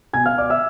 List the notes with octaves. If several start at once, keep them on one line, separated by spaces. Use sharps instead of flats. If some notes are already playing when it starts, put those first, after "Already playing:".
B2 G#5 G#6
F5 F6
D5 D6
E5 E6